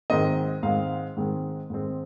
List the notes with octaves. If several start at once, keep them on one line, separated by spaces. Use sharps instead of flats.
G#2 D#3 G#3 C4 D#5
G#2 D#3 G#3 C4 F5
G#2 D#3 G#3 C4
G#2 D#3 G#3 C4